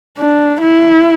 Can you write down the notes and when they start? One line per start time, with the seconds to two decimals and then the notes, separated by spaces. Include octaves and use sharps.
0.18 D4
0.61 E4